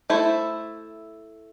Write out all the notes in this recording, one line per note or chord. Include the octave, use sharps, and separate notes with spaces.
A3 E4 A4 C5